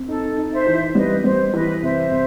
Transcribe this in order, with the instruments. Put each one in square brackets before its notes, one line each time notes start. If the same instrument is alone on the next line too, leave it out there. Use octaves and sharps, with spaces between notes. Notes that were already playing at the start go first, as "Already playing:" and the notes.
Already playing: [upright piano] C4
[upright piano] D#4 [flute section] A4
[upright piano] D#4
[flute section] C5 E5
[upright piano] E3
[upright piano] G3 [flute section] B4 D#5
[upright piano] G3 [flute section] C5
[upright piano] E3 [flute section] B4 D#5
[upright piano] C3 [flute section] C5 E5
[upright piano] C3